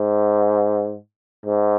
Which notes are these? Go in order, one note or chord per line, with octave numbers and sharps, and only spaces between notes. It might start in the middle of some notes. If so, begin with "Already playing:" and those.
Already playing: G#2
G#2